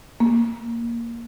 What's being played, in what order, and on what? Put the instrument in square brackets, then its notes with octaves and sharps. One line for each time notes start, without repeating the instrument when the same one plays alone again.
[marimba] A#3